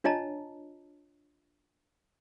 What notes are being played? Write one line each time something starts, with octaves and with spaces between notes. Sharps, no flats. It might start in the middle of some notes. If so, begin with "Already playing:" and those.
D4 F4 C#5 D#5 A5 A#5